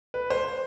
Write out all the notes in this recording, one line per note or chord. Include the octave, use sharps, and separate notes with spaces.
B4
C5